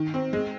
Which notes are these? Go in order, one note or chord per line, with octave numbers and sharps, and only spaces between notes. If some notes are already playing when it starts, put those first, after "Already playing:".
Already playing: D#3
C4
G#3